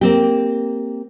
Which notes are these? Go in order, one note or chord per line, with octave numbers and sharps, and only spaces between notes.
A#3 C4 G4